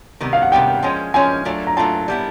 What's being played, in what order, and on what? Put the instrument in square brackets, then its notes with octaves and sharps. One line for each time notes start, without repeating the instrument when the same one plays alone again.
[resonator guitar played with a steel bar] C3 D#3 G3 B3
[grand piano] F5
F#5
[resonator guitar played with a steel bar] C3 D#3 G3 B3 [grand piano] G5
[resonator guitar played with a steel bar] F3 G#3 C#4
[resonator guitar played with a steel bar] F3 G#3 C#4 [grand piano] G#5
[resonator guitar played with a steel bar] F#3 A3 D4 F4
[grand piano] A#5
[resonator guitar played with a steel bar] F#3 A3 D4 F4 [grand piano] A5
[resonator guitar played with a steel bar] G3 B3 E4